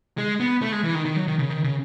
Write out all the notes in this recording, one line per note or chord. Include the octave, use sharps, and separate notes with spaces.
G#3
B3
A3
G#3
E3
D#3
D#3
F#3
D#3
C#3
D#3
C#3